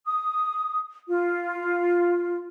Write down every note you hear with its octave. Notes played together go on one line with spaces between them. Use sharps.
D#6
F4